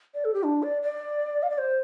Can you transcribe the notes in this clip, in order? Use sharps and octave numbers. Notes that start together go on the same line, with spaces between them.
D5
A4
G4
D4
D5
D5
F5
D5
C5